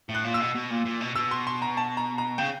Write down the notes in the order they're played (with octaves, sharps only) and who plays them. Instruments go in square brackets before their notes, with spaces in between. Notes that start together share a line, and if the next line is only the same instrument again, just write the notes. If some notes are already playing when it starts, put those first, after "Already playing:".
[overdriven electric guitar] A2
[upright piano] F#6
[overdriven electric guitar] A#2
[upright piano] E6
[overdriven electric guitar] B2
B2
A#2
A#2
B2
[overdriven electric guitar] B2 [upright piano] E6
[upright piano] C6
C6
A#5
A5
A#5
A#5
[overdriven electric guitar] C#3 [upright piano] G5